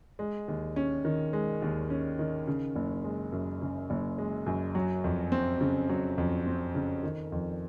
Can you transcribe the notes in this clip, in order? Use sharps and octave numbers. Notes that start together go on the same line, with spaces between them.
G#3
D#2
C#4
D#3
G#3
D#2
C#4
D#3
C#3
F#1
G#3
F#2
C#3
F#1
G#3
F#2
F#3
F2
C4
C#3
F#3
F2
C4
C#3
D#3
F2